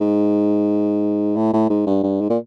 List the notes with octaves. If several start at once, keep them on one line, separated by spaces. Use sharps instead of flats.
G#2
A2
A2
G#2
G2
G2
G#2
A#2